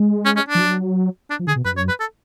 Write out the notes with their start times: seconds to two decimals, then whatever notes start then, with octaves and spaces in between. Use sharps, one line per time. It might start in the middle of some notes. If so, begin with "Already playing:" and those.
Already playing: G#3
0.25 C#4
0.37 C#4
0.48 D4
0.55 F3
0.60 F#3
1.30 D4
1.39 F3
1.47 D3 G#4
1.56 B2
1.65 F#2 B4
1.77 C#5
1.89 B4
2.00 A4